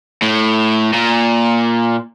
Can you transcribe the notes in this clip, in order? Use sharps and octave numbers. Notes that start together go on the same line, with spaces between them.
A2
A#2